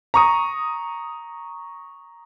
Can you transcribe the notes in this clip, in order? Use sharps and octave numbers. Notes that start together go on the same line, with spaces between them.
A#5 C#6 D#6